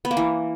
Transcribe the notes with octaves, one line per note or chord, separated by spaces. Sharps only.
B3
A#3
E3